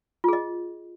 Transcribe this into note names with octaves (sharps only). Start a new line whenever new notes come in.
F4 G#4 D#5